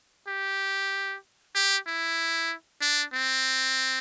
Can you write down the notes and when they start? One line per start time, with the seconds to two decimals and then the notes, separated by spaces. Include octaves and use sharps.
0.28 G4
1.55 G4
1.87 E4
2.81 D4
3.14 C4